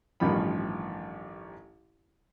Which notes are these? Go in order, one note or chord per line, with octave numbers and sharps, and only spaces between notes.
A1 G2 D#3 F3 C#4 B5